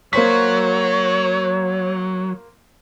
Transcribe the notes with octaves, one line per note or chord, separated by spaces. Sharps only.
F#3 A#3 C5 C#5 B6